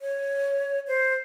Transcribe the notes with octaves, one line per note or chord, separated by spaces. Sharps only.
C#5
C5